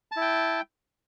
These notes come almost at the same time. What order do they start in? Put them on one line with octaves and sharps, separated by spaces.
A5 E4 G5